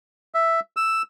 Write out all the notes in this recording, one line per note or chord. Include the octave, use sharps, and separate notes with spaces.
E5
E6